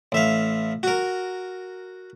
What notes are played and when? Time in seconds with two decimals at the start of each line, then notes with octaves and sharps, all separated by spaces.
0.12 A1 E5 F5
0.83 F#4 A#4